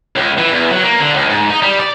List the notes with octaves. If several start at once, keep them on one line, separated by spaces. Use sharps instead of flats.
C#2
E3
E2
F#3
A#3
D3
C#2
G#2
D#4
G3
D5